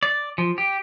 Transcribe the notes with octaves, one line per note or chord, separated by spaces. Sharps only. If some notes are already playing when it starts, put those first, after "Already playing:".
D5
F3
G4